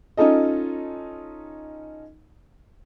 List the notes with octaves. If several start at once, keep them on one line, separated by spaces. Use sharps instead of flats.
C#4 D#4 F4 A4 D#5